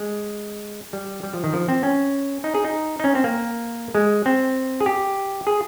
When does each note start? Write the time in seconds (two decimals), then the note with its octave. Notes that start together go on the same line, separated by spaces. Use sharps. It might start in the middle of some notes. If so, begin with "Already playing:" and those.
Already playing: G#3
0.93 G3
1.23 G3
1.34 F3
1.44 D#3
1.53 F3
1.68 C4
1.83 C#4
2.44 D#4
2.55 G#4
2.64 D#4
3.00 D#4
3.04 C#4
3.15 C4
3.24 A#3
3.95 G#3
4.26 C4
4.80 G#4
4.86 G4
5.47 G#4